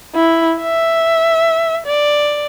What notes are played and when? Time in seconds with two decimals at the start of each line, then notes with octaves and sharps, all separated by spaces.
0.15 E4
0.62 E5
1.86 D5